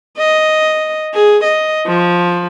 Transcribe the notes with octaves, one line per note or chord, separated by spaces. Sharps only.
D#5
G#4
D#5
F3